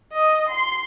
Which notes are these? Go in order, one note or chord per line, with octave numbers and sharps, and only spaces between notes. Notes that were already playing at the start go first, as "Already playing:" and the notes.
D#5
C6